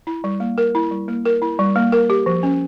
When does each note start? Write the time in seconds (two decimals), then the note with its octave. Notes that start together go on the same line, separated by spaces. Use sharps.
0.07 E4
0.24 G3
0.40 A#3
0.58 A#4
0.75 E4
0.91 G3
1.08 A#3
1.25 A#4
1.42 E4
1.59 G3
1.76 A#3
1.92 A#4
2.10 G4
2.26 F3
2.43 C#4